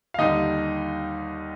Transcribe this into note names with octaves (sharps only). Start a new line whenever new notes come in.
F5
D#2 D3 G3 D#4 D#5